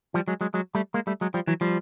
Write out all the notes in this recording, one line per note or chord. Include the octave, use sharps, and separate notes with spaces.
F3 G3
F#3 G#3
F#3 G#3
F#3 G#3
G3 A3
G#3 A#3
G3 A3
F#3 G#3
F3 G3
E3 F#3
F3 G3